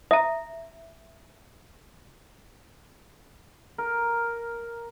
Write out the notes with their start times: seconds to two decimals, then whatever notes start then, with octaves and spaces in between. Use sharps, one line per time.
0.11 E5 A#5 D#6
3.78 A#4